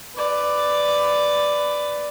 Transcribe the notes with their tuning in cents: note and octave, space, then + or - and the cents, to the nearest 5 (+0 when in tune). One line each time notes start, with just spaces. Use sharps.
B4 +15 D5 +0